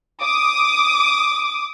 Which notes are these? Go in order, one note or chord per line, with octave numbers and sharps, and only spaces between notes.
D6 D#6